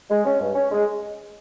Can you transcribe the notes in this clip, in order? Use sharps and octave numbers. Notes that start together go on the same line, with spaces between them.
G#3
C#4
G2
C#4
G#3